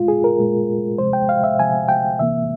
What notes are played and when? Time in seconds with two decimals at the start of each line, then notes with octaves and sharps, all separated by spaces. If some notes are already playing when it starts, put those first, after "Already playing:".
Already playing: A#2 G#3 F4
0.08 G#4
0.24 A#4
0.38 A#2 G#3
0.98 C3 F3 G#3 C5
1.13 G5
1.29 F5
1.44 E5
1.59 C3 F3 G#3 G#5
1.89 G5
2.19 C3 E3 A#3 E5